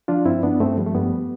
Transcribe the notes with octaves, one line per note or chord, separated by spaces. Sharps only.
F3 D4 F4
G2 C4 E4
G2 B3 D4
G2 A3 C4
F3 G3
A3
G2 G3 B3